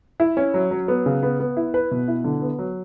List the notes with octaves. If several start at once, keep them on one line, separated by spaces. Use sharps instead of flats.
E4
C#4
F#3
F#3
B3
C#3
B3
B3
E4
B4
B2
E4
D3
B3
F#3